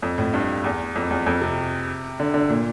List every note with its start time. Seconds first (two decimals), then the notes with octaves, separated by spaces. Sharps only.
0.02 F2
0.18 A2
0.34 G2
0.64 E2
0.96 F2
1.11 E2
1.26 F2
1.41 C3
2.20 D3
2.34 D3
2.50 A#2